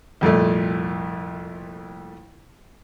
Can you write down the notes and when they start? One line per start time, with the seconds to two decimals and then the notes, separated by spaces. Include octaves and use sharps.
0.21 C2 F2 A#2 A3